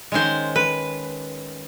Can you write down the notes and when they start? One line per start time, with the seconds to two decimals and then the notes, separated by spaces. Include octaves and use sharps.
0.12 D#3 G#3 C#4 C5
0.56 B4